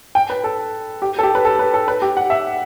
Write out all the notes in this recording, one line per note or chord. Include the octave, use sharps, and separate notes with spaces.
G5
B4
A4
G4
A4
G4
B4
A4
B4
A4
B4
G4
F#5
E5